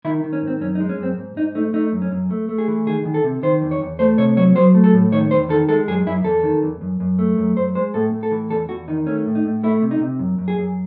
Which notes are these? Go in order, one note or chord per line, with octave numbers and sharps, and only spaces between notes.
D#3 E4
D#3
C#4
G#2
C4
F#2 C#4
D#4
G#3
C#4
F#2 C4
G#2
G#2 D#4
A3 D#4
A3 D#4
F#2
C#4
F#2
A3
A3
G#4
E3
D#3 G#4
D#3
A4
C3
D#3 C5
E2
C#5
E2
A3 C5
C3 C#5
F#3 C#5
F#3 C5
A3
A4
A2
D#3 C#5
E2 C5
D#3 A4
G#3 A4
F#2 G#4
F#2 E4
E2 A4
D#3
E2
F#2
F#2
A3
F#2
F#2 C5
G#3 C5
A2 A4
A2
A4
E3
E2 A4
E2 F#4
D#3 D#4
A3 C#4
A2
D#4
A2
A3 E4
C3
D#4
C3
F#2
F#2
G#4
F#2